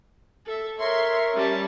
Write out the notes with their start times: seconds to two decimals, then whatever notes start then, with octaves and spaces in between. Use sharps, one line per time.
0.45 A4 E5
0.79 A#4 C#5 E5 C6
1.35 G3 C#4 A5